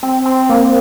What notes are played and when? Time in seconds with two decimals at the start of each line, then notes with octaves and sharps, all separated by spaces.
0.03 C4
0.26 C4
0.50 A#3